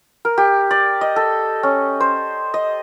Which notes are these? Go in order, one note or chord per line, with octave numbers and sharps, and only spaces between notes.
A#4
G4
D5
D#5
A4
C#4
C5
D#5